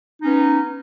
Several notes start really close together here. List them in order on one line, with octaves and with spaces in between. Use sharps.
D#4 C#4 B3